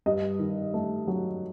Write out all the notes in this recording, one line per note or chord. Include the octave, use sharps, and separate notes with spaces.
G2 D#5
D#3
A3
F#3